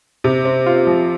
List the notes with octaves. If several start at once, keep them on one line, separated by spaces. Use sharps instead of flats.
C3
C4
F4
F3